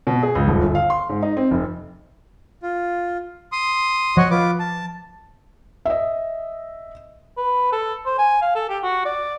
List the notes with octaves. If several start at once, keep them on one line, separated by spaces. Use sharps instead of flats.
B2
G#4
C#2
D#1
G1
F5
C6
G#2
D#4
C4
F1
F4
C6 D#6
F3 F#4 C#5 D#5
F4 B4 D6
A5
D#5 E5
B4
A4
C5
G#5
F5
A4
G4
F#4
D5